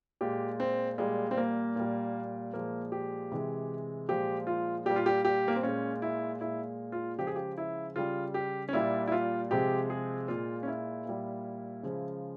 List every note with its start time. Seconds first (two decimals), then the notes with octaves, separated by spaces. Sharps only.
0.21 A#2 G#3 G4
0.60 C4
0.98 A#2 G3 G#3
1.31 C4
1.37 A#3
1.76 A#2 G3
2.53 A#2 F3 G#3 A#3
2.92 G4
3.32 C3 E3 G#3
4.09 A#2 F3 G#3 G4
4.47 F4
4.86 A#2 G3 G4
4.96 F4
5.06 G4
5.25 G4
5.48 A#3
5.56 C4
5.63 A#2 G#3 C#4
6.02 E4
6.41 A#2 G#3 E4
6.92 F4
7.18 C#3 F3 G#3 G4
7.27 G#4
7.36 G4
7.58 E4
7.96 C#3 G3 F4
8.34 G4
8.69 C#4
8.73 A#2 G3 E4
9.07 E4
9.12 F4
9.51 C3 F3 G#3 G4
9.90 G#4
10.28 A#2 G#3 F4
10.63 C#4
10.67 E4
11.06 A#2 G3
11.83 C#3 F3 G#3